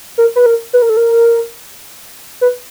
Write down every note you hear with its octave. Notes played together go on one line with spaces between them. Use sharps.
A#4
B4
A#4
B4
A#4
A4
A#4
B4